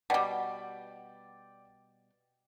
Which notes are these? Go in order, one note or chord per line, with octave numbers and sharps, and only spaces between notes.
B2 G3 D5 F#5 G5